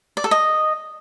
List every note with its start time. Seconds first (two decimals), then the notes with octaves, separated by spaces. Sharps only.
0.17 D5
0.24 A4
0.31 D#5